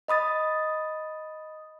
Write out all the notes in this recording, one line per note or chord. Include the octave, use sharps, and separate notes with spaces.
D#5 B5 D#6 A6